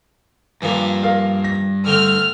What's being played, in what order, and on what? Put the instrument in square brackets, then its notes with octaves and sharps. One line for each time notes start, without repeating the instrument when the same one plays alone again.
[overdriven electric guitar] G2 [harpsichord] E3 F3 A#3
[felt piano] A#4 F5
A#6
[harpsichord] D3 A3 C4 [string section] F6